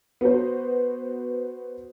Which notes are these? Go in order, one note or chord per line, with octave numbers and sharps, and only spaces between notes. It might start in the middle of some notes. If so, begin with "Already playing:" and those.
B3 F#4 C5